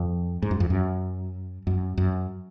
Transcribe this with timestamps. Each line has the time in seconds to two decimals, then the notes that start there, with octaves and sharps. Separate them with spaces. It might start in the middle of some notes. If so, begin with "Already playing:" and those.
Already playing: F2
0.42 G#2
0.51 F#2
0.60 F2
0.70 F#2
1.67 F#2
1.98 F#2